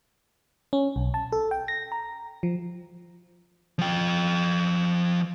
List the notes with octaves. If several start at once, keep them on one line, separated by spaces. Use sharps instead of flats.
C#4
B1
A5
A4
G5
A#6
A#5
F3
F3 G5